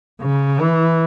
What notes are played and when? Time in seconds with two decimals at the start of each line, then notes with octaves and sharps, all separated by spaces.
0.22 C#3
0.60 E3